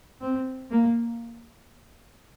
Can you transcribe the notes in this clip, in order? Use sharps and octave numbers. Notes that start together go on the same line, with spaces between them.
C4
A#3